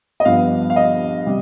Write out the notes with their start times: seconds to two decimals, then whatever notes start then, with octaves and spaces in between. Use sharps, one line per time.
0.20 D#5
0.25 G2 F3 B3 F5
0.70 F5
0.76 D#5
1.26 C3 G3